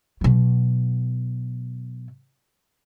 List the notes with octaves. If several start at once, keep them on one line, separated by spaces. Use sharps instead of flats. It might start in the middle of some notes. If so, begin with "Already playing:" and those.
B2 F#3